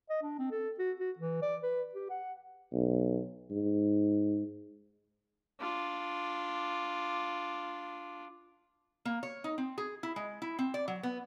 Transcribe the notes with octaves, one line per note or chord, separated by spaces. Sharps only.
D#5
D4
C4
A4
F#4
F#4
E3
D5
B4
G4
F#5
B1
G#2
D4 F4
A#3
C#5
D#4
C4
G#4
E4
G#3
E4
C4
D5
F#3
B3